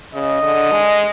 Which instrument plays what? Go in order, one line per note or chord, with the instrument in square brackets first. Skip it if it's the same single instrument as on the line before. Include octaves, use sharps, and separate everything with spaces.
[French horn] C#3 [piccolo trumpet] D#5
[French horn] D3
G#3